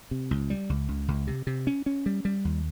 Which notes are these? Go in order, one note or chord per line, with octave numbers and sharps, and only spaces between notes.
C3
C#2
G3
C#2
C#2
C#2
C3
C3
C#4
C#4
G3
G3
D#2